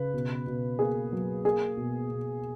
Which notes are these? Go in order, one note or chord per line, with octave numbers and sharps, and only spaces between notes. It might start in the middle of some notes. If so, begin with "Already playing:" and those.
Already playing: C#3 B4
B2
B2
A#3 G#4
F#3
A#3 G#4
B2
B2